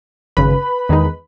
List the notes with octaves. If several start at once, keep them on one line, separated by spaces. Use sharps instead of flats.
G#1 F#2 C#3 B4 B5
E2 D#3 G#3 D#4